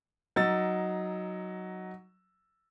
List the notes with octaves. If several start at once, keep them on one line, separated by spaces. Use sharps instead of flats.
F#3 D#4 E6 A6